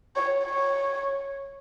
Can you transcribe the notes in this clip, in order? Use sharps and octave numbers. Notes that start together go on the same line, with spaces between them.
C#5
C#5